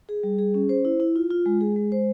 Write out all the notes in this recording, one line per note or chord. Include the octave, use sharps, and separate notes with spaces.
G#4
G3
G#4
C#4
C5
E4
E4
F4
F4
G#3
G#4
G#3
C5